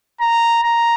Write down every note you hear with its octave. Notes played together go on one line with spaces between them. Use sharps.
A#5
A#5